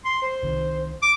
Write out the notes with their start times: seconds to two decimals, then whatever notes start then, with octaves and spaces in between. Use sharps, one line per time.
0.05 C6
0.22 C5
0.43 C2 C3 D#3
1.02 D6